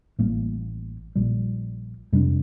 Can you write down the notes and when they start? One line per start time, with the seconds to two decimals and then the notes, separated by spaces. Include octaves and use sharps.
0.19 A1 A2 G3 A#3
1.16 A#1 A#2 G3
2.13 F2 C3 G3 D4